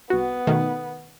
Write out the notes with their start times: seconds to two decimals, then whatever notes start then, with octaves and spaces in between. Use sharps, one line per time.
0.10 C2 B3 F#4
0.47 B2 D#3 A3